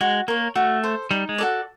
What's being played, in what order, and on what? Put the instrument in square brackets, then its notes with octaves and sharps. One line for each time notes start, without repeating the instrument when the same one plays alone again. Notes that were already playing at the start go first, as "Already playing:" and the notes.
[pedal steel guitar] G#3 [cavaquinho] F#4
[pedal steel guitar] A#3 [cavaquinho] A#4 C#5
[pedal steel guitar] A3 [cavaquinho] F#4
[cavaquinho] A4 C5
[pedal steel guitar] G3 [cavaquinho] D#4
[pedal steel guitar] G#3
[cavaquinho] F#4 A4 D5